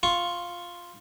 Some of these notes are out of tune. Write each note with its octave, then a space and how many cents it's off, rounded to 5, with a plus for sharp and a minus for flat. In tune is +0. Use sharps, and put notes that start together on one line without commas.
F4 +0 C#6 -10